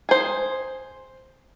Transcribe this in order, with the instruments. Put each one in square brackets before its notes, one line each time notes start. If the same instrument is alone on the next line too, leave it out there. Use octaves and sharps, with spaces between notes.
[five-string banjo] G#4 C5